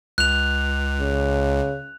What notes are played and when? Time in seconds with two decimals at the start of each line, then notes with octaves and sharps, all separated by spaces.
0.18 C#2 F#6 F7
1.00 C#3